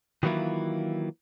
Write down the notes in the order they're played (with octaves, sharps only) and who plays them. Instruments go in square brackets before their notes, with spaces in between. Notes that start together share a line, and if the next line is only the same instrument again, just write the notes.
[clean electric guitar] D#3 E3 F#3 A#3 E4 F4